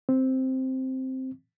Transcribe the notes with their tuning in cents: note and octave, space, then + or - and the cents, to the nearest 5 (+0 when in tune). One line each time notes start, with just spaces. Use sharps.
C4 +0